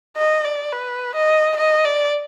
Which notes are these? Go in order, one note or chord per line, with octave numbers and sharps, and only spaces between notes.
D#5
D5
B4
D#5
D#5
D5